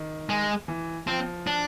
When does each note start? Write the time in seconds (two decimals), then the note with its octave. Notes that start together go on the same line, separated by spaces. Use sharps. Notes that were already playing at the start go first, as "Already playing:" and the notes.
Already playing: D#3
0.29 G#3
0.68 E3
1.07 F3 C4
1.47 D4